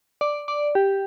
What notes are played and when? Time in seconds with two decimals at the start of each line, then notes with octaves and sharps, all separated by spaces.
0.21 D5
0.48 D5
0.75 G4